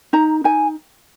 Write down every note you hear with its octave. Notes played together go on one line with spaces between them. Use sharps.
D#4 A#5
D#4 G#5